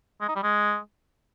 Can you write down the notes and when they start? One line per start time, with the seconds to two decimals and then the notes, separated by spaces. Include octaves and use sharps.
0.21 G#3
0.28 D#4
0.36 G3
0.43 G#3